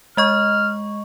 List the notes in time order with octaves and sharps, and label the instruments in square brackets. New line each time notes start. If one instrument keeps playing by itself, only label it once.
[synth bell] G#3 D#5 C#6 [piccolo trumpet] F6